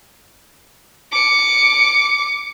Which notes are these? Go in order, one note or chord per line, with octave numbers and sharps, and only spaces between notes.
D6 C#7